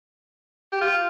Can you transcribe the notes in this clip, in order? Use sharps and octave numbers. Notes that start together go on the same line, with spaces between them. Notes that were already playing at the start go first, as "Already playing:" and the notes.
G4
F4